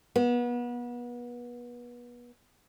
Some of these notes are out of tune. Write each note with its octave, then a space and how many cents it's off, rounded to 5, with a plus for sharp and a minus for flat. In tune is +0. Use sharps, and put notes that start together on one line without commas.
B3 -30